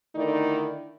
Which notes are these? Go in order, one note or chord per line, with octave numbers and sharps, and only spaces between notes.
D3 D#3 A3 D#4 E4 D5